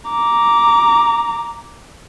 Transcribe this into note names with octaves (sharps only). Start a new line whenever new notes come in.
A#5 D6